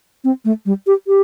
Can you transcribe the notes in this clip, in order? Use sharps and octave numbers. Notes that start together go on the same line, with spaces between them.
C4
A3
G3
G4
G4